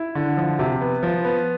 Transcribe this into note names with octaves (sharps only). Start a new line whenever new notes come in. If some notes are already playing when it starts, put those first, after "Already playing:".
Already playing: E4
D3
F3
C3
B3
F3
B3